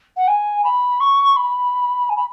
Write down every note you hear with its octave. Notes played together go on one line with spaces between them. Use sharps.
F#5
G#5
B5
C#6
B5
G#5
B5